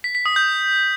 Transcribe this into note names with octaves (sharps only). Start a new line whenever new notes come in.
B6
B6
D#6
G6